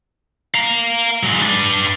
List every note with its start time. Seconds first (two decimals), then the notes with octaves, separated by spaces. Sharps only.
0.55 F5 A#5
1.23 F#3 G#3
1.42 D4 B4